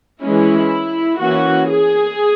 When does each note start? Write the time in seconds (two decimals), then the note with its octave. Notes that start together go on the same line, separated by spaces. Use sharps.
0.22 E3 G#3 C#4 E4
1.20 E3 A#3 C#4 F#4
1.69 G#4